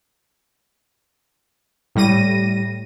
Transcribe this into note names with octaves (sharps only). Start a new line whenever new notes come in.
A2 G3 A#6 D#7